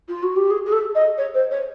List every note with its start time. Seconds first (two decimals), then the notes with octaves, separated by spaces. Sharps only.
0.08 F4
0.22 F#4
0.36 G4
0.50 G#4
0.65 G#4
0.72 A4
0.95 D#5
1.17 C#5
1.34 C5
1.51 C#5